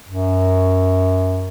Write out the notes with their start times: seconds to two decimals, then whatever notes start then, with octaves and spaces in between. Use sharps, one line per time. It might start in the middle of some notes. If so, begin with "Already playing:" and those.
0.08 F#2